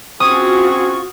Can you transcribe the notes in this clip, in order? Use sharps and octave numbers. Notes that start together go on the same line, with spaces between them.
C4 C#4 F4 F#4 G#4 C#6 D#6